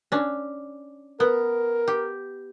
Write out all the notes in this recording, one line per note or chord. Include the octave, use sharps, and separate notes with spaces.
C#4 D4
B3 A#4
G4